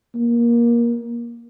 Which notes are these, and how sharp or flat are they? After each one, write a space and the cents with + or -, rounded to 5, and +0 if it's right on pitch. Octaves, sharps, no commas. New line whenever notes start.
A#3 +20